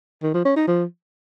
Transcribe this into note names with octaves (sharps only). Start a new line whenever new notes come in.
D#3
F3
C#4
D#4
F3